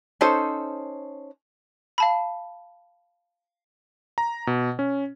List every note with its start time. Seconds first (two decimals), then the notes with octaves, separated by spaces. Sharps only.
0.21 C#4 D#4 A4 C5
1.98 F5 A5 B5
4.18 A#5
4.47 B2
4.79 C#4